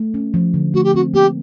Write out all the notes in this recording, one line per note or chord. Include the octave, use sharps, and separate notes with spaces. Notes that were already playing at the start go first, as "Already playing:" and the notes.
Already playing: A3
C#4
F3
D3
A3 F#4
G4
C4 F#4
A#3 G4